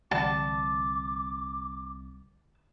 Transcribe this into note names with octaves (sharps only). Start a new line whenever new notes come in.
C2 D3 E3 D5 A5 D6